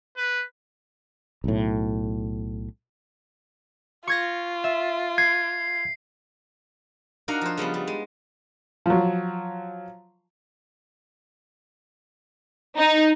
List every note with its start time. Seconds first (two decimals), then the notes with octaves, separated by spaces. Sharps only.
0.17 B4
1.44 B1 A2
4.07 F4 C#6 G#6 A#6
4.64 E5
5.18 G#6 C7
7.28 D4 D#4 F#4 A#4 F5 F#5
7.41 F3 C5
7.57 C#3 F3 G3 B3
7.74 G3
7.87 G#3
8.86 F3 F#3
12.78 D#4